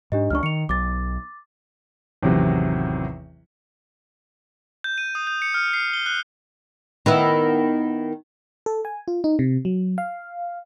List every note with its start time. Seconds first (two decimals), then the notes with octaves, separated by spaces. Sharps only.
0.12 G#2 D4 G4 D#5
0.30 C#2 F#3 D4 C#6 F6
0.43 D#3 C#7 F7
0.69 B1 D6 A6
2.23 A1 E2 C3 D#3 F#3
4.84 G6
4.98 D#7
5.15 D#6
5.27 G6
5.42 C#7
5.54 F6
5.73 C7
5.93 G7
6.06 F#6
7.06 D#3 B3 E4
8.66 A4
8.85 G#5
9.08 F4
9.24 D#4
9.39 C3
9.65 F#3
9.98 F5